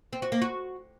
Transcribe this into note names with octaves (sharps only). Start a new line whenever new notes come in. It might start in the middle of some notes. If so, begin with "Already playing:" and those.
C4
F#4
A#3
F#4